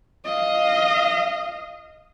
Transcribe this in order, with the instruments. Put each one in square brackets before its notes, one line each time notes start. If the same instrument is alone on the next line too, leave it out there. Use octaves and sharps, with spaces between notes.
[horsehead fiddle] D#5 F5